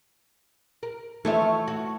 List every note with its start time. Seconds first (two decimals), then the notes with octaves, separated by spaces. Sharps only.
0.83 A#4
1.25 E3 F3 A3 C#5 E5
1.68 F#4